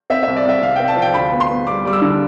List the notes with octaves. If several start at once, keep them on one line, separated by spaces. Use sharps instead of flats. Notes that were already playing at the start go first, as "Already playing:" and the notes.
C4 E5
C2 E5
D5
C2 E5
C3 F5
C4 G5
A5
F3
G5
D2 B5
B3
C6
B3
G3 D6
G3 D6
E6
D3